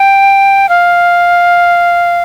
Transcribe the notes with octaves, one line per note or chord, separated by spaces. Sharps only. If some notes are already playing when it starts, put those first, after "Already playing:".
Already playing: G5
F5